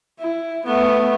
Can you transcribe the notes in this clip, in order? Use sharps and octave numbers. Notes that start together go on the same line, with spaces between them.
E4
A3 B3